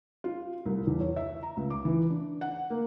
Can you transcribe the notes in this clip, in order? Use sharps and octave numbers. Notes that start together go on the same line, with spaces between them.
F4
C2
E2
C#5
E5
A#5
C#2
D6
E3
D4
F#5
A#3